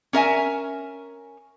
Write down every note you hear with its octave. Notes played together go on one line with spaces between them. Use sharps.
C#4 A#4 E5 G#5